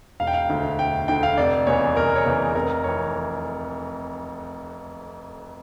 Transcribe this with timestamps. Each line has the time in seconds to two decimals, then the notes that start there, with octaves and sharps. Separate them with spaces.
0.20 E1 F5
0.27 G5
0.34 F5
0.49 D2 D3
0.78 E1 G5
1.08 D2 D3 G5
1.23 F5
1.37 F1 D5
1.67 E2 C#3 E3 C#5
1.97 F1 A#4
2.15 C#5
2.26 E2 C#3 E3 A#4
2.54 F1 A#4
2.84 F2 E3 C#5